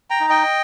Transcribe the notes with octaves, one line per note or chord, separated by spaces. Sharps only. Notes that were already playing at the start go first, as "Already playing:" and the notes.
G5 A#5
D#4
D#5 G5